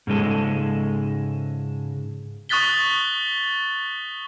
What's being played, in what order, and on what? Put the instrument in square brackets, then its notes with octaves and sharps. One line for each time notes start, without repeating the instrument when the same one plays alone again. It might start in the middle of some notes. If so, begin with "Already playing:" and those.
[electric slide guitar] G#2 C#3 G#3 A4
[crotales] C#6 D#6 F#6 A6 B6 G7